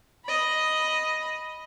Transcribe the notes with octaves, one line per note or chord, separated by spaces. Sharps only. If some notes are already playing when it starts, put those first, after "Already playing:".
D#5 B5